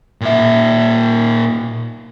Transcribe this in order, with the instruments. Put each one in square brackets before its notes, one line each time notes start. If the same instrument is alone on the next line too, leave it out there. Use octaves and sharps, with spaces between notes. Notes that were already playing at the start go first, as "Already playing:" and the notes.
[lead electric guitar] A#2 E5